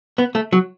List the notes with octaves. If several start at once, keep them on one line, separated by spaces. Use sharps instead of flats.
B3
A3
F#3